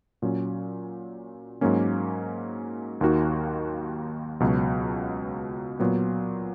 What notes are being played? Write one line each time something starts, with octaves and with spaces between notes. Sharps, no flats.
A#2 F#3 C#4
G#2 F#3 A#3 C#4
D#2 D#3 A#3 D#4 F#4
C#2 B2 F#3
A#2 F#3 B3